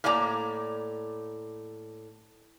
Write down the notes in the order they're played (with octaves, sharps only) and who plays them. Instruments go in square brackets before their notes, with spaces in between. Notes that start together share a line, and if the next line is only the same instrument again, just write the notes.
[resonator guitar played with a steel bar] A2 A#3 D5 G#5 A#5